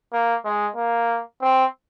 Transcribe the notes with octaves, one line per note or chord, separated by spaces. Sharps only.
A#3
G#3
A#3
C4